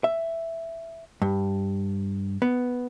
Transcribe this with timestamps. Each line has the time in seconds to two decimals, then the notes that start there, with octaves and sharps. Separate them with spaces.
0.04 E5
1.22 G2
2.42 B3